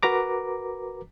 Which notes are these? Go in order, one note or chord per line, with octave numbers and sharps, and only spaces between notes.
F#4 A#4 B4 A#5 D6